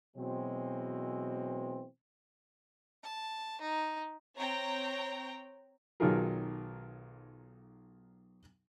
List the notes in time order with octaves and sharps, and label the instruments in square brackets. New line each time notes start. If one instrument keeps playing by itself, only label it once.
[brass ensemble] B2 E3 F#3 G#3 C4
[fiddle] A5
D#4
[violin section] C4 C#5 G5 A#5
[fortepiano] B1 D#3 F#3 F4 G#4 A#4